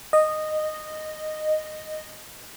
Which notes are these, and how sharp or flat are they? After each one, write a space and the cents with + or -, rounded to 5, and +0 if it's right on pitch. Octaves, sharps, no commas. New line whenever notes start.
D#5 -10